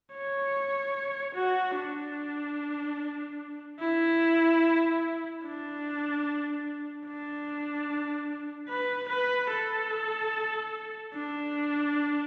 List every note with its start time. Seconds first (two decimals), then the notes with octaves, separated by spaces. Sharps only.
0.14 C#5
1.35 F#4
1.75 D4
3.79 E4
5.43 D4
7.06 D4
8.69 B4
9.09 B4
9.50 A4
11.13 D4